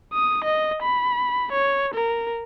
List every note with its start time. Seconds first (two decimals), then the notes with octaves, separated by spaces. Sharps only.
0.14 D#6
0.44 D#5
0.83 B5
1.52 C#5
1.95 A#4